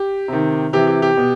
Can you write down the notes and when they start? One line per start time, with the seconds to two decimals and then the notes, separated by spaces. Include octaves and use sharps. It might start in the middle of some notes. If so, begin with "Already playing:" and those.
Already playing: G4
0.28 C3 D#3
0.73 C3 E3 G4
0.87 G4
1.02 G4
1.17 B2